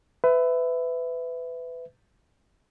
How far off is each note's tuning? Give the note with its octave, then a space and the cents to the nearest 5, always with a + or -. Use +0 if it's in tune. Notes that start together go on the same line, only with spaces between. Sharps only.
B4 +25 E5 +0